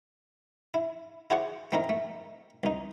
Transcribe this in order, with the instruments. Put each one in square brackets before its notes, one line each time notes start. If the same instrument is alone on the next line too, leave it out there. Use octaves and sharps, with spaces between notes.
[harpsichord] E4
E4 F#4 G#4 C5 D5 F#5
A3 C4 D#4 E4 A#4
A3
C2 D#4